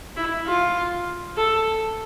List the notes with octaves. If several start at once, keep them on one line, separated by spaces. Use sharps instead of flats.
E4
F4
A4